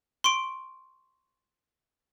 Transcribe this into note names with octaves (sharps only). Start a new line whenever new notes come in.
C6 C#6 D7